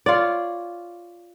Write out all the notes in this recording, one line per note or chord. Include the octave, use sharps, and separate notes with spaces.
F4 C#5 D5